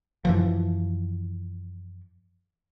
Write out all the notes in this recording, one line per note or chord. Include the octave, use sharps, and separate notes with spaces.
F#2 E3 F3